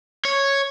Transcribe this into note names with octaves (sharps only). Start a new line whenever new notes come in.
C#5